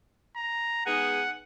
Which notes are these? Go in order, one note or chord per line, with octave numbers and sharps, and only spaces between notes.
A#5
G#3 B3 D#4 G#4 F#5